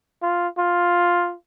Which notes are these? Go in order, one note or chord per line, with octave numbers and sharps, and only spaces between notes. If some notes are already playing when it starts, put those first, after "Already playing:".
F4
F4